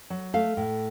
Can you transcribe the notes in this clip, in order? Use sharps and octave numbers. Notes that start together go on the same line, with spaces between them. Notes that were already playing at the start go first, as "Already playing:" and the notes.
F#3
A3 F5
A2